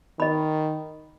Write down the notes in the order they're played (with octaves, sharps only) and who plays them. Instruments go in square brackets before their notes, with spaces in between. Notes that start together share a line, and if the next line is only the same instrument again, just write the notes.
[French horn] D#3 [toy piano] D#5 B5